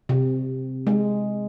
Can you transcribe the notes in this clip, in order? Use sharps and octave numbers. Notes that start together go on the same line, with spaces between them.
C3
G#3